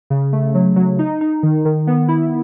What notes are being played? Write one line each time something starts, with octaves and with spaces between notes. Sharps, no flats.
C#3
A3
F#3
F#3
D#4
D#4
D#3
D#3
B3
E4